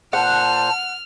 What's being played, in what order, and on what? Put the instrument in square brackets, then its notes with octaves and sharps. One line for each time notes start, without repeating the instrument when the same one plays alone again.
[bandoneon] A#2 C5 [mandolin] F#5 [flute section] A5 [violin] F6